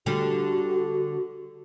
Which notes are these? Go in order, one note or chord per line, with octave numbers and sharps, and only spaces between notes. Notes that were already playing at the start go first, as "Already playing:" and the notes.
D3 G3 F#4